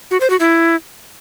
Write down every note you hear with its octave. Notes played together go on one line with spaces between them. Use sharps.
F#4
C5
F#4
E4